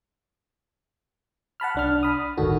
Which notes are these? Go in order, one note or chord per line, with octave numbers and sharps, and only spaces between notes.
F#5 A5 B5 F6
C2 D4 F6
B5 D#6
G1 D2 A2 D#3 F#4 A4